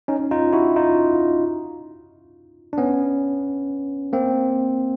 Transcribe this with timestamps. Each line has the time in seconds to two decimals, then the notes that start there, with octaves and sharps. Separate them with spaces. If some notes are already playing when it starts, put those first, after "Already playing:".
0.08 C#4 D#4
0.31 D#4 F4
0.53 E4 F#4
0.76 D#4 F4
2.73 D4
2.78 B3 C#4
4.13 A#3 C4